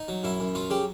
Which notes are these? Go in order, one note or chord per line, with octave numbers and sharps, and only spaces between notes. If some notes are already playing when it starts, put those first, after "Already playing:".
Already playing: D#4
F#3
F#2 E4
F#2
F#3 F4
C#3 G4